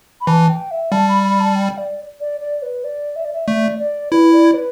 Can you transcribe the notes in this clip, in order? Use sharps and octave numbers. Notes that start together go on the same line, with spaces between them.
B5
E3 A5
G5
E5
G3 A5
B5
B5
A5
G5
D5
D5
D5
B4
D5
E5
D5
E5
A3 D5
D5
E4 B4
D5
B4